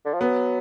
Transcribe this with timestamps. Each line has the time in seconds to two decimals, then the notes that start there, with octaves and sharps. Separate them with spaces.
0.05 D3
0.14 F3
0.20 F#3 B3